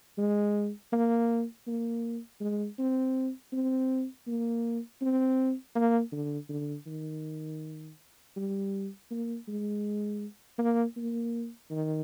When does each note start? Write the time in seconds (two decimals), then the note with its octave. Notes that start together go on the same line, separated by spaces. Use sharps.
0.18 G#3
0.93 A#3
1.67 A#3
2.41 G#3
2.78 C4
3.53 C4
4.27 A#3
5.02 C4
5.75 A#3
6.12 D3
6.49 D3
6.87 D#3
8.36 G3
9.11 A#3
9.48 G#3
10.58 A#3
10.97 A#3
11.71 D#3